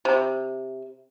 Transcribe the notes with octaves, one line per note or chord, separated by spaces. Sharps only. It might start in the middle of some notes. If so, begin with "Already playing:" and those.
C3